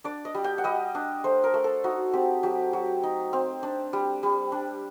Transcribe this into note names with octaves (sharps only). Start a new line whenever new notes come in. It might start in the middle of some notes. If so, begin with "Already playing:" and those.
D4 D5
D#5
G3
G5
F#5
G3 D#5
D4
A3 C5
A#4
A3
A4
D#4 F#4
C4 G4
F#3 G4
F#3
D#4
C4
D4
G3
G3
D4